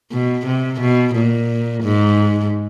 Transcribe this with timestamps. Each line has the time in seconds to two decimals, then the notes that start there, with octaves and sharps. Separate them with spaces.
0.12 B2
0.47 C3
0.81 B2
1.15 A#2
1.83 G#2